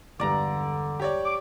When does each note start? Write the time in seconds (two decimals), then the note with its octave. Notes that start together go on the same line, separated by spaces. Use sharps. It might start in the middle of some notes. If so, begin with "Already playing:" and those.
0.20 E1 G2 D3 D5 A#5
1.00 G4 C#5 D5
1.26 D6